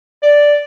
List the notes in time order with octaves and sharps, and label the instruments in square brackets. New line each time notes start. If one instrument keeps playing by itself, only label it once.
[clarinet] D5